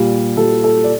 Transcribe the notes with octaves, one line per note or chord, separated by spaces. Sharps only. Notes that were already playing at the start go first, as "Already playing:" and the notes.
Already playing: A#2 G3
A#2 G3 A4
A4
D5